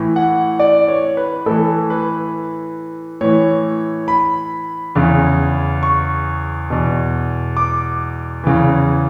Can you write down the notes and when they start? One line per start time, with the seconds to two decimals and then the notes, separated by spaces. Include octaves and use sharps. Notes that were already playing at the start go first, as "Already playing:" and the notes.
Already playing: A2 E3
0.16 F#5
0.59 D5
0.88 C#5
1.17 B4
1.46 A2 E3 A4
1.90 B4
3.21 A2 E3 C#5
4.08 B5
4.95 E2 C#3 E3
5.83 C#6
6.70 E2 B2
7.57 D6
8.44 E2 C#3 E3